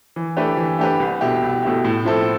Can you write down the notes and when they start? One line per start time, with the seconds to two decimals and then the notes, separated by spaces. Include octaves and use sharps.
0.16 E3
0.37 A3 D4 G4 B4
0.57 E3
0.79 A3 D4 G4 B4
1.00 C2
1.21 B2 A3 E4 G4
1.42 C2
1.63 B2 A3 E4 G4
1.84 A2
2.05 F3 C4 E4 A4